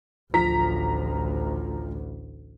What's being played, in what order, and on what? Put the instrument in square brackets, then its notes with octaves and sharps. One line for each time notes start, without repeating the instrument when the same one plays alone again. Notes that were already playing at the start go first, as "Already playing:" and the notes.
[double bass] A1 D2 [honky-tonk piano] F3 A#5 B6